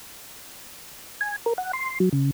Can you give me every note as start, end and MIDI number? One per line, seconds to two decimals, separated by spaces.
1.21 1.36 80
1.46 1.53 70
1.58 1.72 78
1.73 1.99 84
2.00 2.09 54
2.13 2.31 49